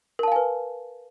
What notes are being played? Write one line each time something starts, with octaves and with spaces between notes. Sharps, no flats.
A#4 B4 F5 G#5 A5